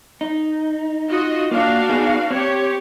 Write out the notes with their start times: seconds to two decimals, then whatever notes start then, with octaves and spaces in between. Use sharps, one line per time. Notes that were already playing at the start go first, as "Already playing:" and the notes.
0.21 D#4
1.08 F4 F#4 D#5
1.51 A#3 D4 F#4 F5
1.89 B3 D#4 G#4
2.31 C4 G4 C#5